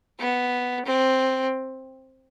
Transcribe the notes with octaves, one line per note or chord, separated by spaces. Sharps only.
B3
C4